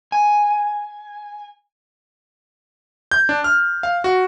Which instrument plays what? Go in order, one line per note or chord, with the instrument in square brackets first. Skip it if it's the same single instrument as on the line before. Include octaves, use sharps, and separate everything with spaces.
[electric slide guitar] G#5
[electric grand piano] G6
D4
F6
F5
F#4